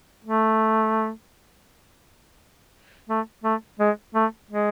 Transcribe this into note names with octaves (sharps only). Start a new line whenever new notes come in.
A3
A3
A3
G#3
A3
G#3